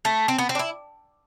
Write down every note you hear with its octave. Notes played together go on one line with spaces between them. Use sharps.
A3
C4
B3
C4
D4
E4